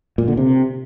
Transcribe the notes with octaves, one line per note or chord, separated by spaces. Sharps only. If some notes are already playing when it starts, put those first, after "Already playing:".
A#2
D3
C3